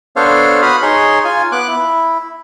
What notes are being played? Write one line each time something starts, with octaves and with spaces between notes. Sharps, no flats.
B3 D4 A4 C5 C#5 F5
F#4 B4 B5 D#6 F6
D#4 G#4 C#5 C6
F4 G#5
B3 D6 F#6
E4